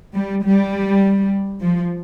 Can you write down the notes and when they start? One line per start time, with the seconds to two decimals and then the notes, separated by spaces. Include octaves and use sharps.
0.15 G3
0.45 G3
1.61 F3